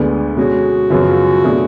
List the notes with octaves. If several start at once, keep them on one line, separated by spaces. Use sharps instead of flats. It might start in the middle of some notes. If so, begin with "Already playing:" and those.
Already playing: D2 D3 G#3 B3 D4
B2 G#3 C#4 F#4
F#2 C#3 F3 B3 F4
B2 A3 D4 G#4